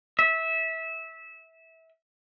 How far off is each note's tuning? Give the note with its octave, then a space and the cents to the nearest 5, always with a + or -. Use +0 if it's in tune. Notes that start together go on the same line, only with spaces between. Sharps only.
E5 -20